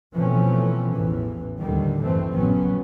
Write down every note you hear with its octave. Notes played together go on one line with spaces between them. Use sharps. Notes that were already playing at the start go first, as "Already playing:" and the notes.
B2 E3 F3 A3 C4 C#4
A1 E2 E3
D#2 A2 D3 D#3 G3
G2 E3 A3 C4
A#1 A#2 C#3 F#3 B3 C#4